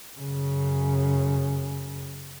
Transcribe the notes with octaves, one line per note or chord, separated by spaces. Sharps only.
F#2 C#3